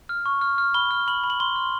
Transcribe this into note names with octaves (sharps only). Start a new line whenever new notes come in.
F6
C#6
F6
F6
B5 G7
F6
B5 F#7
B5
F#7
C6 G7
F6